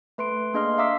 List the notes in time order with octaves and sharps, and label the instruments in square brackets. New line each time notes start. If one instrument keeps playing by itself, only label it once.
[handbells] A3 B4 C6 D7
A#3 D4 G#4 D#5 C6 F6
E5 F5 A#5 D6 E6 B6